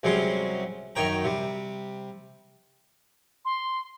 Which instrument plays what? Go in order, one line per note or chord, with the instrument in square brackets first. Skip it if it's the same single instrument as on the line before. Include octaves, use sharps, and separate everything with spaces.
[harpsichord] C2 C3 F#3 G#3 C#4 C6
F#2 D#3 C#5 G5 A#5
C3 G3
[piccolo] C6